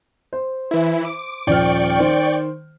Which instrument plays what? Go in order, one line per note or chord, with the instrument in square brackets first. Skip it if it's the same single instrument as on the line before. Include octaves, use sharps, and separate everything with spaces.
[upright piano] C5
[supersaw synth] E3 E4
D6
[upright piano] D#1 F3 F6 [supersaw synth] D5 G5 C#6
[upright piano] D#3 C5